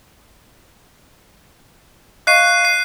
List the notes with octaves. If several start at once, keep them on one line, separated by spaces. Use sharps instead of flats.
D#5 F5 C#6 F#6 C7 D#7
C7